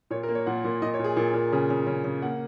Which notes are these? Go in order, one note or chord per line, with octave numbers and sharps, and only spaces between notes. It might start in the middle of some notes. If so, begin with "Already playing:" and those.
A#2 C#5
A#4
A#3
C#5
A#2 F#5
A#2
A#2 D#5
C#5
A#2
G#4
A#2
A#2
C#3 G#4
C#3
C#3
C#3
A#3 F#5